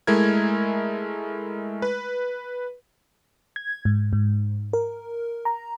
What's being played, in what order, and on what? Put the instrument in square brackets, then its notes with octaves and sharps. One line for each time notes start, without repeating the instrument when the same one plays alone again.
[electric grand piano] G#3 A3 E4 A#4 G#6
B4
[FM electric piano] G#6
G#2
G#2
A#4
A#5